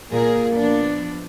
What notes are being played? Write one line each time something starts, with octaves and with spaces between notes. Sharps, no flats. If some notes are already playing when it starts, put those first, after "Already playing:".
A#2 A#3 G#4 A#4
F3 B3 D4